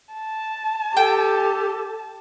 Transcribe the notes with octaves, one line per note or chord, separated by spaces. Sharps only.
A5
G4 A4 G5